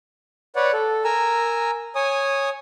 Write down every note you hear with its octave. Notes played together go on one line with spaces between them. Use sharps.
B4 C#5 D5 F#5
A4
A#4 G#5 A#5 E6
C#5 G#5 D#6